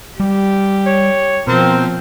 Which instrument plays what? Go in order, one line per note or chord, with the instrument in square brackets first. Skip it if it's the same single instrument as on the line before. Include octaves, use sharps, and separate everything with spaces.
[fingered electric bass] G3 [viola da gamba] G4
[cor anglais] C#5
[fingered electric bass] B2 [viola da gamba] F3 [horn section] C4 [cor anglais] A#4